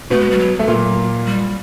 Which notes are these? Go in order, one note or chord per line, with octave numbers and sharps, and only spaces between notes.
B2 A3 B3
G#3
G3
F#3
A3
A#2 F#3 A#3
G3